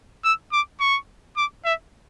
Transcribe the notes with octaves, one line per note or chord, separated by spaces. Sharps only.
E6
D6
C#6
D6
E5